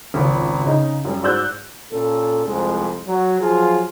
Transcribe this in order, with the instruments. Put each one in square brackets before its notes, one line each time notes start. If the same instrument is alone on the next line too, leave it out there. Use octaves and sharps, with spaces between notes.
[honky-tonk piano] G#1 C#2 F#3
C#3 D#4
F#2 G3
G#2 F#4 D5 E6 F#6 G6
[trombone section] A#2 C#4 A4
C2 F2 G#3
F#3
F3 F#3 F4 G#4